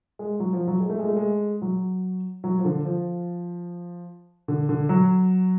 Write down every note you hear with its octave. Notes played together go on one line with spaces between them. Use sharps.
G#3
F#3
F3
F#3
G#3
A3
G#3
A3
G#3
F#3
F#3
F3
D3
F3
D3
D3
F#3